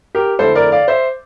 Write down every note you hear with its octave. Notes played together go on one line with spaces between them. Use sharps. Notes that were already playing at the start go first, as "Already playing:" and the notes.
G4 A#4
F2 D3 A3 E4 A4 C5
A#4 D5
D5 F5
C5 E5